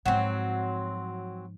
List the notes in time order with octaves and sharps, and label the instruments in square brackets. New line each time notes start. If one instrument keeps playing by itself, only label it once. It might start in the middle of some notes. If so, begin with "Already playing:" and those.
[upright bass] G#2 F3 [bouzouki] F#3 C4